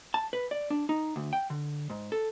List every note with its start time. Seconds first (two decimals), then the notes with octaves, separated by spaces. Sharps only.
0.14 A5
0.33 B4
0.51 D5
0.70 D4
0.89 D#4
1.16 D2
1.33 G5
1.50 D3
1.90 G#2
2.12 A4